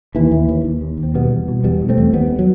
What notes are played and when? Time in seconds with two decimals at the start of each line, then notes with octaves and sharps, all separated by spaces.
0.15 D#2 E3
0.31 D#2
0.49 D#2
0.64 D#2
0.81 D#2
0.97 D#2
1.03 C4
1.14 B2 G3 B3
1.32 E2
1.48 B2
1.64 E2 G3 B3
1.81 B2
1.89 A3 C4
1.98 E2
2.13 D#2 G3 B3
2.39 F#3